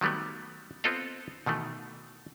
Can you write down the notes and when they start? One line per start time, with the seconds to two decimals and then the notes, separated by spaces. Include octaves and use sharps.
0.01 D#3 F#3 G3 A3 B3
0.84 B3 C4 F4 A4 D#5 F5
1.46 B2 D#3 E3 A3